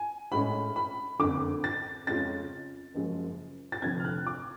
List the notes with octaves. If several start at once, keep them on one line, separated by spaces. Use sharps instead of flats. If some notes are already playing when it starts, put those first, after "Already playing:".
Already playing: G#5
A2 G#3 C#4 B5
B5
F#1 F2 D3 D6
A6
F2 C#3 G#3 C#4 F4 A6
F#1 F#2 F3 G#3
A6
F1 F2 D3 F3 G#6
F6
F#6
D6